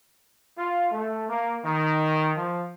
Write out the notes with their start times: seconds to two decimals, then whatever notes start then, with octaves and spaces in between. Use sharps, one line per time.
0.58 F4
0.91 A3
1.29 A#3
1.65 D#3
2.36 F3